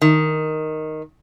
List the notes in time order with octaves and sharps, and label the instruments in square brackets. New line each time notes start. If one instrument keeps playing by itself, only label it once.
[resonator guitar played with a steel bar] D#3